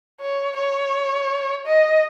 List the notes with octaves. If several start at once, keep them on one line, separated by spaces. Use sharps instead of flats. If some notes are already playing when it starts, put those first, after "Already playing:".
C#5
C#5
D#5